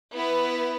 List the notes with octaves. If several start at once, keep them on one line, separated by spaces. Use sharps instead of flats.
B3 E4 B4